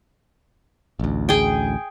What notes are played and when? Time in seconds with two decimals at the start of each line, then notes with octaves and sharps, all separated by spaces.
1.00 A1 D2
1.29 G#4 G5